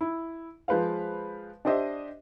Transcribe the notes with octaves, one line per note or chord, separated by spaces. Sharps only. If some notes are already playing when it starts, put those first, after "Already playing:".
E4
F3 G#3 B4 C5 F5
D4 G4 C5 D#5 E5